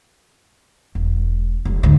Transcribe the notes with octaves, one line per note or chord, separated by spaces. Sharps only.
E1
F1 F#2
D2 G#2